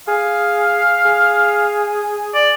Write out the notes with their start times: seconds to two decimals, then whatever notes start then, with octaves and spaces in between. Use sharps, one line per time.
0.08 G#4 F5
1.06 G#4
2.35 D5